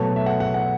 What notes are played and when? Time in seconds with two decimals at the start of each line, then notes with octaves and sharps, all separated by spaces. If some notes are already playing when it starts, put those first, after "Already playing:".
Already playing: B2 F#3 A3 A5
0.16 E5
0.26 F#5
0.40 F#5
0.54 F#5